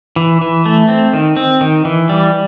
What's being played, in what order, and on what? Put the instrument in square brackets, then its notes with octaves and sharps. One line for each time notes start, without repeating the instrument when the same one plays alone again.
[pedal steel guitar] E3
E3
A3
C4
D#3
C4
D#3
E3
G3